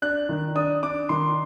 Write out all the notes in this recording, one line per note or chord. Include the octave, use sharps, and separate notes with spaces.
D4 F#6
D#3
D4 D#6
D4 D6
D#3 C6